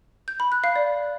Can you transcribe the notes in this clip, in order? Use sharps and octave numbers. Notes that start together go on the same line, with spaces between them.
G6
B5
F#6
F5
D5